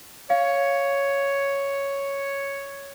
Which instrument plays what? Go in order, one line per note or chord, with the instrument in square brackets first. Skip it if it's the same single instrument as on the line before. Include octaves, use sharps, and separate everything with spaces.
[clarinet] C#5 [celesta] F5